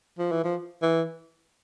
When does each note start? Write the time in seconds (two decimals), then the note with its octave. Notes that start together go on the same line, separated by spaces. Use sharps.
0.19 F3
0.32 E3
0.44 F3
0.82 E3